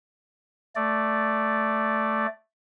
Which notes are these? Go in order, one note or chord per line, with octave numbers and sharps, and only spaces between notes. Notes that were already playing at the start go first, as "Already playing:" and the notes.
A3 D5